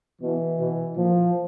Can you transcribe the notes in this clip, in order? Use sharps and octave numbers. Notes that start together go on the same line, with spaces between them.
B2 E3
B2
A#2 F3